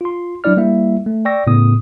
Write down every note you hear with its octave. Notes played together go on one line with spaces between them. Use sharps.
F4 C6
F#3 D4 E4 D5 F6
G3 A#3 E4 E5
A3
D5 G5 C#6 E6 A#6
A2 C#3 B3 D#6